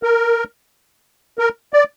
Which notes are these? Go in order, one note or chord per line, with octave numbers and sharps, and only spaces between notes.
A#4
A#4
D5